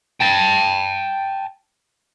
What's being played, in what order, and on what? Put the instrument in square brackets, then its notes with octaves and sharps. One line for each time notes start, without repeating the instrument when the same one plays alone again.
[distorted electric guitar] G5 A5